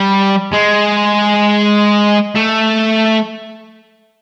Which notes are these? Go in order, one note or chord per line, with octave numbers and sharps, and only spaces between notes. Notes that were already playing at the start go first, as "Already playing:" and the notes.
Already playing: G3
G#3
A3